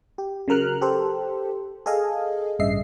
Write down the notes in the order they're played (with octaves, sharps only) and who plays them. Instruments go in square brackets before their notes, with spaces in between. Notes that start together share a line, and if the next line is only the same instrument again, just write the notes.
[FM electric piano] G4
C#3 F#3 A#4 F6 F#6
G4 A4 C5
G#4 A4 D#5 F5 G#5
A1 G2 C#3 D#5 E5 C7